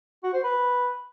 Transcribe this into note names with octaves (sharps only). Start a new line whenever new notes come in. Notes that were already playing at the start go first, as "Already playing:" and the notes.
F#4
C5
B4